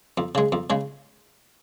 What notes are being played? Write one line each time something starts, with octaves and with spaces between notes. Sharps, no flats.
F2
C#3 G#3
F2
C#3 G#3